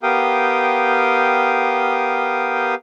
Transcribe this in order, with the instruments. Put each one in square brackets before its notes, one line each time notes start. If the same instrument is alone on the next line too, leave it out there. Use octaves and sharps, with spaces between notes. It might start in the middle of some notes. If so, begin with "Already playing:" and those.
[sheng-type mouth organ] B3 G4 A#4 F5 G5 D#6